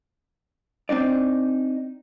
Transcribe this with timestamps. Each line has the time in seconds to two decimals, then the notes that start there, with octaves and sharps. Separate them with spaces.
0.89 C4 D4 D#4 D5